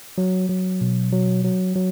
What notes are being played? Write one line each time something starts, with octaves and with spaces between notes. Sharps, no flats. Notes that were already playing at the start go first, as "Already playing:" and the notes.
F#3
F#3
B2
F#3
F#3
F#3